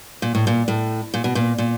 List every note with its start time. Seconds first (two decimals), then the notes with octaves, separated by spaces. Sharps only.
0.22 A#2
0.35 A2
0.47 A#2
0.68 A2
1.14 A#2
1.24 B2
1.35 A#2
1.58 A#2